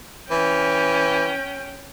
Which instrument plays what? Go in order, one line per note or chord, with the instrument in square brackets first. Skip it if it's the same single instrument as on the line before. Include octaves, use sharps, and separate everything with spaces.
[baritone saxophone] E3 [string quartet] C#4 G5